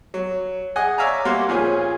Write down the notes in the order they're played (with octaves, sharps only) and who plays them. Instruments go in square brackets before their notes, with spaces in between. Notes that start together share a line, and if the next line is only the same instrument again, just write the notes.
[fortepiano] F#3
G#4 D#5 F#5 G#5
C#5 D5 E5 F5 G#5 A#5
G3 A#3 F#4 C5 F5
A#2 F3 C#4 G#4